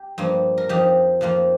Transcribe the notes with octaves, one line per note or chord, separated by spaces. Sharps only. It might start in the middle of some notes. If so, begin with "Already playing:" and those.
Already playing: G4
G2 F3 A#3
A#4
F2 F3 D#4 G4
F2 F3 A#3 F4